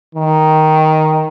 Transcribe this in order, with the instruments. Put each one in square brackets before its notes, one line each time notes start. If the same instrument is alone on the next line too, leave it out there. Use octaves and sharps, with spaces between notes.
[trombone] D#3